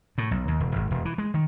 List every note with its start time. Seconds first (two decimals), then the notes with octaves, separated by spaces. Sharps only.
0.18 A2
0.31 B1
0.48 D#2
0.60 E1
0.76 G#1
0.91 E1
1.05 E3
1.18 G#3
1.34 D#3